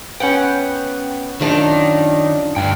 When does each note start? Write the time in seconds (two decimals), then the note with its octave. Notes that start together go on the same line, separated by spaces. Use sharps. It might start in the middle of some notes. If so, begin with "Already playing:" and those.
0.20 B3 C#4 F#5 G5
1.41 F#2 D#3 D4 F4
2.56 D2 G2 G5